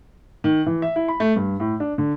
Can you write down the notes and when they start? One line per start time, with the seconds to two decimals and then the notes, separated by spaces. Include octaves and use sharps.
0.44 D#3
0.66 E3
0.82 E5
0.96 E4
1.08 B5
1.20 A3
1.36 G2
1.60 A2
1.80 D4
1.98 D3